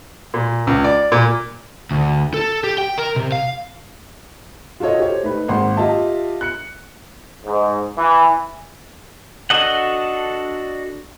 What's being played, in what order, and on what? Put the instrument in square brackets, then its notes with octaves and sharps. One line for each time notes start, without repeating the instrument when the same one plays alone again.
[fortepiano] A#2
C#2
D5
A#2
[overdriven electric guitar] D2
A4
G4
G5
A#4
C3
F5
[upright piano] F4 F#4 A4 C#5 D#5
G4 A#4 C5 C#5
A3 D#4 B4
G#1 A#3 F#5 C6
F4 G4 D#5 E5 A5
F#6 C#7
[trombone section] G#2
E3
[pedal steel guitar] D4 F#4 A4 D#5 F#5